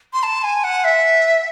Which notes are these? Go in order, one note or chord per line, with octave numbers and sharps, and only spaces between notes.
C6
A5
G#5
F#5
E5